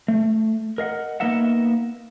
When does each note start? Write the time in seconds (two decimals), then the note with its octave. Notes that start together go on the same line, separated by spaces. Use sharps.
0.08 A3
0.78 A#4 D#5 F5 F#5
1.20 A#3 B3 D#4 A#4 E5 F#5